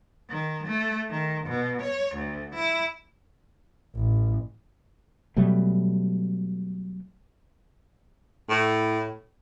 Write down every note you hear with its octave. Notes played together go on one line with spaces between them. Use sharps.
D#3
A3
D#3
B2
C#5
D2
E4
A1
B2 F#3 G3 A3
A2